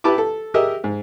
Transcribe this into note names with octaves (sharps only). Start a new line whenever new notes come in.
E4 G4 B4 A5 D6
A4
G4 G#4 A#4 D#5 E5
G#2